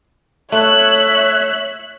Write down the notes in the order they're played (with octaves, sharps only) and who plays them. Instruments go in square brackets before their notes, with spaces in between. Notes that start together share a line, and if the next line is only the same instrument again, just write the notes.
[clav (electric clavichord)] A3 [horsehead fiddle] C#5 E5 [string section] F#6